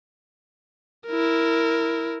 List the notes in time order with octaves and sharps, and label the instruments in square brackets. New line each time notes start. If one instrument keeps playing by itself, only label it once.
[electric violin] E4 A#4